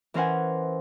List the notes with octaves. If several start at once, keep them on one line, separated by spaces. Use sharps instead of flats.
E3 C#4 A#4 C5 F#5 G#5